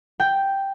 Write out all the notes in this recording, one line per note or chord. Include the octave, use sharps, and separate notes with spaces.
G5